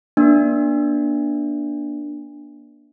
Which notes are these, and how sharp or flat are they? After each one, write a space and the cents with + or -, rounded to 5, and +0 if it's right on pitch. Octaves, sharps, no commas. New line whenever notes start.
A#3 +45 D4 +0